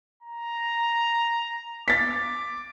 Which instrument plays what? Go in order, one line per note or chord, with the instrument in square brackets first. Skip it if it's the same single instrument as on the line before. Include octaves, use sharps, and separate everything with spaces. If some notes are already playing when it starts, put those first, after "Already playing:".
[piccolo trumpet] A#5
[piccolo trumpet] D6 [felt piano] A6 B6